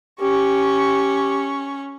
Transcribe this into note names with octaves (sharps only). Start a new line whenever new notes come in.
C#4 G4 C#6